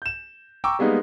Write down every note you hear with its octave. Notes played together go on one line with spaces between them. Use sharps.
G6 E7
G5 A#5 C#6 D6 E6
G3 G#3 A#3 B3 D#4